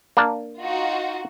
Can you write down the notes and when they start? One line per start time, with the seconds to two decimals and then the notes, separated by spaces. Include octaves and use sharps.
0.17 A#3 D4
0.60 D#4 F4 F#4